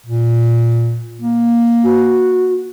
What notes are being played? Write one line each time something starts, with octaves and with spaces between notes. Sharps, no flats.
A#2
A#3
F#4